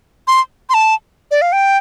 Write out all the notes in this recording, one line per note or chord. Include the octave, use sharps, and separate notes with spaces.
C6
C6
A5
D5
F5
G5